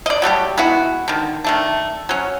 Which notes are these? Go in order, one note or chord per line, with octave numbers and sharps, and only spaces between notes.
D5 D#5
F#3 G3 A3 G4
G#3 B3 E4 F#4
D3 D#3
D#3 A3 D4
F#3 C#4